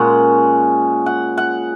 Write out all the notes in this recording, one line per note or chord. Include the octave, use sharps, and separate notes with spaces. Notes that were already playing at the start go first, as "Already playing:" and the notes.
Already playing: A#2 G#3 C#4 F#5
F#5
F#5